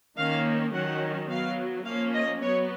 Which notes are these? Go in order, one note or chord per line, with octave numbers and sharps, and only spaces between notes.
D#3 A#3 C#4 F5
D#3 F#3 C#4 F#5
F#3 B3 F5
F3 A#3 C#4 F5
D#5
F#3 B3 C#5